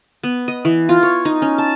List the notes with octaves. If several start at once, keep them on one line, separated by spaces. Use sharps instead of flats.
B3
D#5
E3
F4
C#5
D#4
C#4
A5